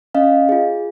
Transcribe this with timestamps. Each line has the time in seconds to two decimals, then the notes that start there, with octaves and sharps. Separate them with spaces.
0.15 C#4 D#5 F5
0.49 F4 G#4